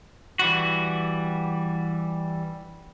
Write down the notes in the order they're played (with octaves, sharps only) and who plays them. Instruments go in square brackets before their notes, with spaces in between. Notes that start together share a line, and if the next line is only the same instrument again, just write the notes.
[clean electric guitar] E3 G3 F#4